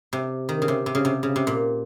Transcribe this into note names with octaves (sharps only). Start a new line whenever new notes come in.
C3
D#3
C#3
C3
C3
C#3
C3
C#3
C3
A#2